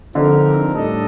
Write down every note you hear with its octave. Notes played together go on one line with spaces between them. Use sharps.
D3 F3 C4 D#4 A#4
A2 G3 D4 A4 D#5